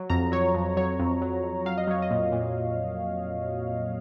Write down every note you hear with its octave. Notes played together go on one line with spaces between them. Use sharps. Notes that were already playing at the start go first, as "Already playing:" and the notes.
Already playing: F#3
F2 A#5
F#3 C#5
F2
F#3 C#5
F2
F#3
F2
F#3 F5
D#5
F#3 C#5
D#5
A#2
A#2